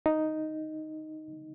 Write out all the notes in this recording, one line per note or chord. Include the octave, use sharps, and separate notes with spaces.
D#4